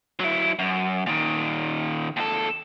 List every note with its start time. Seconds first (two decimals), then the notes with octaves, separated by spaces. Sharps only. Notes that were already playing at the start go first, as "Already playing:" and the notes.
0.20 F#3 E4
0.59 F#2
1.06 A#2 D#3
2.17 D#2 A4